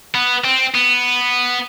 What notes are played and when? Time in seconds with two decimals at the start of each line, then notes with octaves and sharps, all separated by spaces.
0.15 B3
0.44 C4
0.75 B3